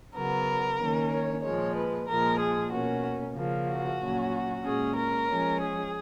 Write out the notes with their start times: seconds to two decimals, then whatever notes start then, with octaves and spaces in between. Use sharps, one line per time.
0.15 C#3 F#3 B3 A#4
0.80 D#3 A#3 C#4
1.11 C#5
1.43 A#2 F3 G#3 C#5
1.76 B4
2.08 A#2 F3 G#3 A#4
2.39 G#4
2.72 B2 A#3 C#4 F#4
3.35 C#3 F3 A#3
3.68 F#4
3.99 A#2 F#3 C#4
4.63 A#2 G#3 C#4 G#4
4.96 A#4
5.28 F3 G#3 C#4
5.61 G#4